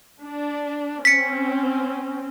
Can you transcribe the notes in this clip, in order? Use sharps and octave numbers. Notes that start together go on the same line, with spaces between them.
D4
C4 C#4 B6 C#7